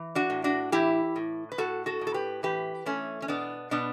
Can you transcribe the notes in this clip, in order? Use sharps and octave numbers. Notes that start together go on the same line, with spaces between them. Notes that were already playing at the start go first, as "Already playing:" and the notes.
Already playing: E3
D4 F#4
A2
D4 F#4
E3 E4 G4
A2
B4
A2 F#4 A4
F#4 A4
A2
A4
G4 B4
E3 G4 B4
E3 A3 C#4
C#4
B2 B3 D4
B2 B3 D4